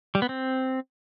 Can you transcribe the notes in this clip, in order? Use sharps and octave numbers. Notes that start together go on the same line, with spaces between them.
G3
B3
C4